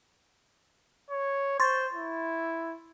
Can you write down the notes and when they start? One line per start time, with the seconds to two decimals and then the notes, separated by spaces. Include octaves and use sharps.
1.10 C#5
1.60 C5 C6 C#6 A6
1.93 E4